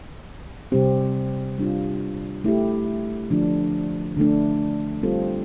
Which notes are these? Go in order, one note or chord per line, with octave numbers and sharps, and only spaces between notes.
C3 G3 C4 G4
G3 D4 F4
A3 E4 G4
D3 F3 A3 D4
D3 A3 D4
G3 C4 F4 A4